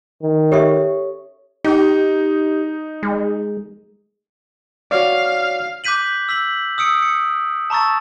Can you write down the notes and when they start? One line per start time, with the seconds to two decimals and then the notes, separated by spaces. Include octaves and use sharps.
0.22 D#3
0.52 G4 A4 C#5 E5
1.64 D#4 G4
3.03 G#3
4.91 F#4 C#5 D5 F5
5.84 D6 F#6 G6 B6 D#7 F#7
6.29 E6 B6 F#7
6.78 D#6 E6 C#7 D7
7.02 C#7
7.70 A5 A#5 C#6 E6 A6